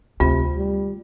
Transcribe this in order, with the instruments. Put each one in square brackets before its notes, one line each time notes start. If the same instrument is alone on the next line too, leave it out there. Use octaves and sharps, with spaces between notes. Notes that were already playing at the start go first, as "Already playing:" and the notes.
[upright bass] D2 [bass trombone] C3 [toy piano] F4
[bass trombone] G3